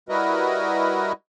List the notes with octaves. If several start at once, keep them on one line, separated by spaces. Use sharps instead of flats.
G3 E4 F#4 A#4 B4 D#5